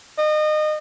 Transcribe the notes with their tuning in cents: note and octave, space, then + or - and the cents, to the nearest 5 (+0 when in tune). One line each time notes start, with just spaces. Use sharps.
D#5 -30